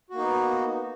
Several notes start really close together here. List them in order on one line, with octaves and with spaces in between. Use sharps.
F#4 A#3 D#4 B3